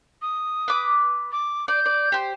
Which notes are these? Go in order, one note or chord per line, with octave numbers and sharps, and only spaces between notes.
D#6
B4 D6
D6
D5 G6
D5
G4 C5